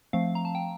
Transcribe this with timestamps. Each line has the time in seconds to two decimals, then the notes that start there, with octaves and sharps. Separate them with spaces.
0.13 F3 A3 C4 F5
0.35 A#5
0.45 A5
0.55 G5